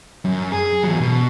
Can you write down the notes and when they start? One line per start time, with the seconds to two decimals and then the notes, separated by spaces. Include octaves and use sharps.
0.25 F#2
0.52 G#4
0.83 E2 F#3
1.01 B2